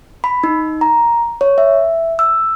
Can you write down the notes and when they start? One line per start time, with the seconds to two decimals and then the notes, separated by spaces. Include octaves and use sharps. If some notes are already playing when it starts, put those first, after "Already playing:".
0.24 B5
0.44 D#4
0.81 A#5
1.41 C#5
1.58 E5
2.19 E6